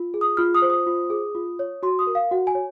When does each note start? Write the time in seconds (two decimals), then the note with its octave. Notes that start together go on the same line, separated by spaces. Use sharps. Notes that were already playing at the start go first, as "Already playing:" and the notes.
Already playing: F4
0.14 G#4
0.21 D#6
0.37 F4 F6
0.55 D#6
0.62 C5
0.70 D#6
0.86 F4
1.10 G#4
1.35 F4
1.59 C#5
1.83 F#4 C6
1.99 D#6
2.07 A#4
2.15 F5
2.31 F#4 F#5
2.47 G#5
2.55 C#5